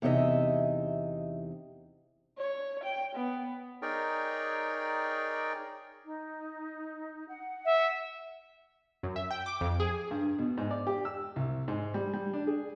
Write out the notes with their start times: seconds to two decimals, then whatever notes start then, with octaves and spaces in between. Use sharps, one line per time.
0.02 E2 C3 D#4 D#5 E5
2.38 C#5
2.84 G5
3.16 B3
3.82 D#4 G#4 A#4 C#5 D5 G5
6.05 D#4
7.28 F#5
7.65 E5
9.03 F#2
9.16 E5
9.31 G5
9.46 D6
9.61 F2
9.80 G#4
10.11 G2
10.39 B2
10.57 G#2
10.71 D5
10.87 G4
11.05 E6
11.36 C2
11.68 G#2
11.94 G3
12.13 G3
12.33 D4
12.47 G#4